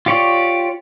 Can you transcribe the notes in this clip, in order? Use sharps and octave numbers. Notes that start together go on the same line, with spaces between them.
F4 G4 C#5 D5